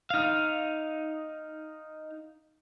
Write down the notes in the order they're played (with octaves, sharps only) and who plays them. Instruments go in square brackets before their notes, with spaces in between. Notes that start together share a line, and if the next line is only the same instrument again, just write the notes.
[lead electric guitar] D#4 F5